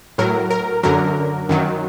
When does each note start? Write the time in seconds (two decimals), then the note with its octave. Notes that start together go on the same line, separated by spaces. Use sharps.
0.18 A2 F#3 A#4
0.50 A#4
0.83 F#2 D3 F#3 A#4
1.49 F#2 D#3 F#3